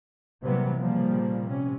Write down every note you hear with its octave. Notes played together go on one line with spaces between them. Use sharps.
C3 E3 F#3 G3 A#3 B3
A#2 C#3 F3 G3 A#3
C3 C#4